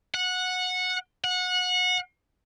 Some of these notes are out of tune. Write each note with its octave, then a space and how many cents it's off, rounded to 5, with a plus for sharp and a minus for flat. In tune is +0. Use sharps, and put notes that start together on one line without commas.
F#5 -15
F#5 -25